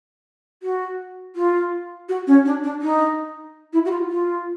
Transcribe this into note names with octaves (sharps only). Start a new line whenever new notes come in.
F#4
F4
F#4
C#4
D4
D4
D#4
E4
F#4
F4
F4